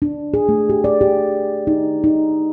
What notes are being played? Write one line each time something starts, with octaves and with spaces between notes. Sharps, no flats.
D4
G#4
A3
G4
D5
G4
D#4
D#4